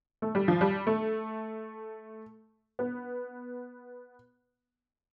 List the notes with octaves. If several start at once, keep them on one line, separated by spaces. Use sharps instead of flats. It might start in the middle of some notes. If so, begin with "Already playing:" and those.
A3
G3
F3
G3
A3
B3